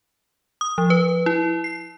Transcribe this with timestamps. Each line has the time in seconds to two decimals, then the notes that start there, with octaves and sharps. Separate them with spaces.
0.61 D#6
0.78 F3
0.90 B4
1.26 E4
1.64 C7